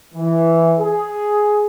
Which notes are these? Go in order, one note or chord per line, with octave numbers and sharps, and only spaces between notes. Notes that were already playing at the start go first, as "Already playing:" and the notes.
E3
G#4